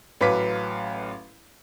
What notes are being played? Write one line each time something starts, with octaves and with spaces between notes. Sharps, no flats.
A1 F#3 B4 F5 D6 B6